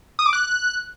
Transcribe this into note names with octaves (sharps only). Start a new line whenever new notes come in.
D#6
D6
F#6